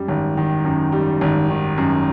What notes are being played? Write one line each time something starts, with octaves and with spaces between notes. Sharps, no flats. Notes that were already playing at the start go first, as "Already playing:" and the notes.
Already playing: F#2 G3
G#1
D#3
F#2
G3
G#1
D#3
F#2